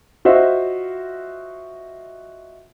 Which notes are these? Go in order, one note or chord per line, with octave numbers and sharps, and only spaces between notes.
F4 F#4 C5 D#5 E5